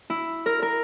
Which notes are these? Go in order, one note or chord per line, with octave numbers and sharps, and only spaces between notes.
E4
A#4
A#4